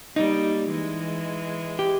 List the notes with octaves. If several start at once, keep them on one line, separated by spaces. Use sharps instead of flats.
G3 A#3 D#4
E3 G#3
G4